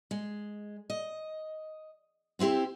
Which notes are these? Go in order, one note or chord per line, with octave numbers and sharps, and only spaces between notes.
G#3
D#5
B3 C4 E4 G4 C5